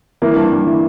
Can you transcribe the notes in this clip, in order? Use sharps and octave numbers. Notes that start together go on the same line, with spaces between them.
E3 A#3
G2
G2
E3